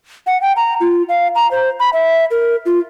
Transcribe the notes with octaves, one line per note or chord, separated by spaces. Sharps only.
F#5
G5
A#5
F4
F5
A#5
C5
B5
E5
A#4
F4